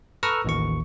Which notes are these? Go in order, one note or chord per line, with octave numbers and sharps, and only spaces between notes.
A4 B4 A#5 C#6 E6 F6
A1 D#2 C#6